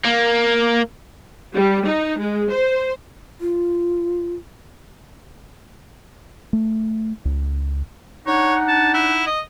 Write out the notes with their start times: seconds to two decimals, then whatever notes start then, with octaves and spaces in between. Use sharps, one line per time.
0.05 A#3
1.54 G3
1.84 D#4
2.18 G#3
2.50 C5
3.41 F4
6.53 A3
7.25 C#2
8.27 D4 D#4 C#5 F#5
8.68 A5
8.94 E4
9.26 D#5